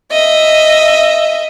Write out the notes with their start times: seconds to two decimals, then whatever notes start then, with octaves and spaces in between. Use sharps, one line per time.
0.12 D#5 E5